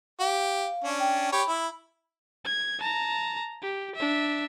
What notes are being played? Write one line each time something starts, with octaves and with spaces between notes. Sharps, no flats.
G4 F5
C#4 D4
G5
G4 C#5 B5
E4
G#6
A5 A#5
G4
D4 E5